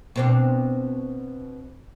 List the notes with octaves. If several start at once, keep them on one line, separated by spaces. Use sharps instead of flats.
B2 C4 D4